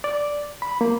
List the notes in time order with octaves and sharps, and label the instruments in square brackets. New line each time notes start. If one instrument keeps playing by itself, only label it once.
[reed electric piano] D5
B5
A#3